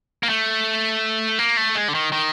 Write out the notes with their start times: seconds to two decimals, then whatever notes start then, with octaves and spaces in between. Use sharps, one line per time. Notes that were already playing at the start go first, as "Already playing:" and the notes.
0.23 A#3
0.29 A3
1.39 A#3
1.57 A3
1.75 G#3
1.88 D3
1.95 D#3
2.12 D#3